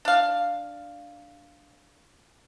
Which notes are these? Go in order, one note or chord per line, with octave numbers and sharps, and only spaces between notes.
D4 F5